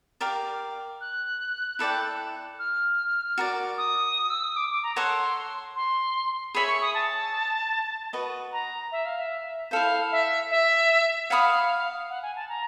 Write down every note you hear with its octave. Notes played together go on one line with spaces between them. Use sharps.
G4 A#4 D5 F5
F#6
E4 A4 D5 G5
F6
F#4 A#4 D5
D#6
E6
D#6
D6
D6
A#5
A4 C#5 F#5 C6
C6
G#4 C#5 E5 G#5 B5
C#6
D#6
A5
F#4 B4 D#5
A#5
E5
F5
E5
E4 A4 C5 F5
E5
E5
C#5 F5 F#5 B5 D#6
F#5
G#5
A5
A#5